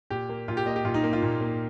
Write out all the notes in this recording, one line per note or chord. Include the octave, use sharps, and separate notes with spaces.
A#2 G4
A#3
A#2 F4
G4
A#3 D#5
G4
A#2 F4
D#4
A#3
F4
A#2
A#3